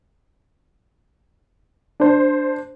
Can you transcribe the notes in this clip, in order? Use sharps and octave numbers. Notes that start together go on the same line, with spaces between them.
D4 C5